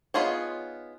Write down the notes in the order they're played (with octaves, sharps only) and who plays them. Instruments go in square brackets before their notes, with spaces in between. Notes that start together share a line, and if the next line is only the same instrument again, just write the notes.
[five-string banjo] B3 D#4 F4 G#4 C#5